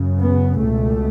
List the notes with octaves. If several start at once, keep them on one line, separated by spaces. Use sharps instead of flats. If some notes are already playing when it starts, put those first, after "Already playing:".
Already playing: F#2 C#3
B3
C#2 B2 A3